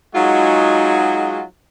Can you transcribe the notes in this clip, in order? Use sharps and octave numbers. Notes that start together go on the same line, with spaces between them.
F#3 G#3 D#4 F4 F#4 G#4